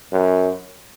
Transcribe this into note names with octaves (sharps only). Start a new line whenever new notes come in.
F#2